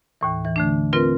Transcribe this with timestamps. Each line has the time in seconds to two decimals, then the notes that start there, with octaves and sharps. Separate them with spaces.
0.21 D#2 A2 E3
0.45 E3
0.56 D3 A3 D4
0.93 C4 F4 A#4 B4